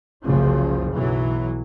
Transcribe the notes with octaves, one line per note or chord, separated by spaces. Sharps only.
F#1 C2 C#3 F3
B1 E3 F#3